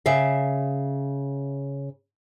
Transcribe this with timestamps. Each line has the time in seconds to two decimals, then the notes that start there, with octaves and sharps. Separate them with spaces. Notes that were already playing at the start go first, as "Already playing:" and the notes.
0.06 C#3 E5 F5